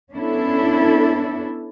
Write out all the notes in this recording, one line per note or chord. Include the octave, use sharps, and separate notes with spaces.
B3 C#4 D4 E4 A4